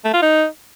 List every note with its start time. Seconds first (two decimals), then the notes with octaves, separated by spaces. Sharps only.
0.04 A3
0.13 F4
0.22 D#4